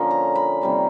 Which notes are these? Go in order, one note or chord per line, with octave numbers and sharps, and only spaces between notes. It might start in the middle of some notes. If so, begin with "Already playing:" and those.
Already playing: D3 F3 A#3 C#4
A#5
B5
C3 D#3 G3 A#3